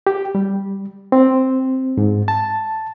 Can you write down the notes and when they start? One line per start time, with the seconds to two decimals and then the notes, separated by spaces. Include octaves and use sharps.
0.07 G4
0.35 G3
1.12 C4
1.97 G#2
2.28 A5